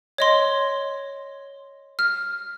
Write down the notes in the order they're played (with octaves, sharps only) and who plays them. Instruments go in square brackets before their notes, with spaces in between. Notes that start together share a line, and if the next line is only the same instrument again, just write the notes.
[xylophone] C#5 D#5 C6
F6